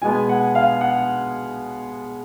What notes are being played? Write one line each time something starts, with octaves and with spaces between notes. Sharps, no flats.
B2 G#3 B3 G#5
F#5
F5
F#5